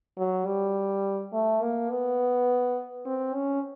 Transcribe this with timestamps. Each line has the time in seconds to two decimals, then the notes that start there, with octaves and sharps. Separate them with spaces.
0.18 F#3
0.46 G3
1.33 A3
1.62 A#3
1.90 B3
3.05 C4
3.34 C#4